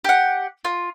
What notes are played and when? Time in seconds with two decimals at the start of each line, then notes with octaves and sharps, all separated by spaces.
0.04 G4 F#5
0.65 F4